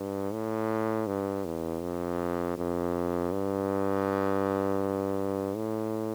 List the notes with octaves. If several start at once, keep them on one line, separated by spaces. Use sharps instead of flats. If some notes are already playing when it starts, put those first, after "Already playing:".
Already playing: G2
A2
G2
E2
F2
F2
G2
A2